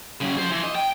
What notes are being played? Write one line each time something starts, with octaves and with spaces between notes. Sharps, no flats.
F#2 C#3
F3 C5
E3
D#5
G5